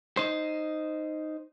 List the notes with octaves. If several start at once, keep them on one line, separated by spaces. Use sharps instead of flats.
D#4 C5